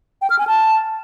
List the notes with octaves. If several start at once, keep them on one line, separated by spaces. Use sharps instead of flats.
G5
F6
G#5
A5